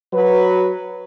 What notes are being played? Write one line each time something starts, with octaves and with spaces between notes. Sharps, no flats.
F#3 B4